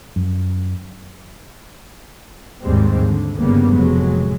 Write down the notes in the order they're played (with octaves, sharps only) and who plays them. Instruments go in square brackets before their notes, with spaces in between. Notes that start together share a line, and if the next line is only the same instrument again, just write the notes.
[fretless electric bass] F#2
[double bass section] D#2 G#2 G3 G#3 C4
D3
G1 G2 C#3 G3 A#3 B3
F1 A2 F#3 G#3